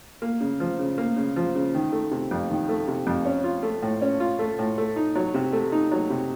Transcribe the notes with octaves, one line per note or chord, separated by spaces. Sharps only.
A#3
C#3
F3
C#3
A#3
C#3
F3
C#3
D#3
A3
C3
F2
D#3
A3
C3
F2
C#4
F4
A3
A2
C#4
F4
A3
A2
A3
D#4
F#3
C3
A3
D#4
F#3
C3